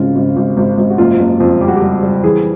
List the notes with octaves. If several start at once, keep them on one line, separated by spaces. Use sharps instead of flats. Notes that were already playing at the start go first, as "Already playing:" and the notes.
Already playing: G#1 C#3 F4
G#1
G#1
G#1
G#1
F#4
F#1 F4
F#1
F2
G3 G4
F#4
G4
G3
G3
E3 G#4